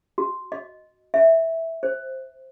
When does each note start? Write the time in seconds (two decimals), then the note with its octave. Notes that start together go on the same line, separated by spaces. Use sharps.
0.18 F#4
0.52 D#5
1.14 E5
1.83 C5